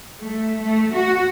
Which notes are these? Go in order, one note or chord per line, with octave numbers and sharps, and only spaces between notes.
A3
A3
F#4